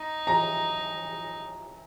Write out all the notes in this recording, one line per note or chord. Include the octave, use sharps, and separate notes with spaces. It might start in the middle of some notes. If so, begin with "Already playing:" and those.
Already playing: D#4
A#5